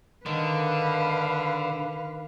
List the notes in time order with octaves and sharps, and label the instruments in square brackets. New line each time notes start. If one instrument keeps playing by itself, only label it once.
[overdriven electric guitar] D3 [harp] D#3 [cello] B4 F5